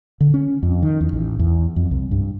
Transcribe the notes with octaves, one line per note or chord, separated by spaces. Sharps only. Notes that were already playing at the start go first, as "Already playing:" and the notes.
D3
C#4
F2
D#3
E2
A1
E2
F2
C2
G2